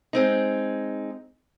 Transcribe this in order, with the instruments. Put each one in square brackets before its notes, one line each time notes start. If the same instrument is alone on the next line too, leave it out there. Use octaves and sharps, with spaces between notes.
[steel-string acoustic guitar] G#3 C4 D#4